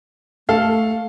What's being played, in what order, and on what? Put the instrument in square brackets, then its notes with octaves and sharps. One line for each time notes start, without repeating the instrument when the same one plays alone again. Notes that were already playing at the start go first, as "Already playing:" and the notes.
[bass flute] A3 [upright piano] A4 F5